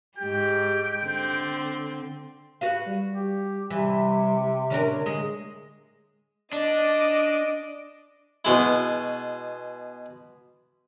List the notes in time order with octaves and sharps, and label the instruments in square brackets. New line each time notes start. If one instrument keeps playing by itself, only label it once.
[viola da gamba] G#2 G4 [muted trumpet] G5
[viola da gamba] D3 C4
[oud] F#4 B4 F5
[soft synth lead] G3
[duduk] G4
[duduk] C3 [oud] E3 [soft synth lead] G3
[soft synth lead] D3 [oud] C#4 D4 A#4
[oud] G#3
[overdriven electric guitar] D4 [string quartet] D#5 D6
[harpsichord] B2 G#3 E4